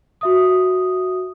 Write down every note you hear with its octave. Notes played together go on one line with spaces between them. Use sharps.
F#4 E5 D#6